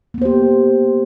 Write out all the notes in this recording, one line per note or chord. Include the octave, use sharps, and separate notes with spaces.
A#3 B3 G4 C5